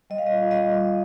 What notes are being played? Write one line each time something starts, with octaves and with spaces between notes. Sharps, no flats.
G3 D#5
F5
F4 D#5
G3 D#5
G3